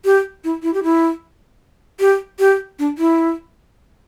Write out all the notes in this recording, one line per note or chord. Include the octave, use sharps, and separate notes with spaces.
G4
E4
E4
G4
E4
G4
G4
D4
E4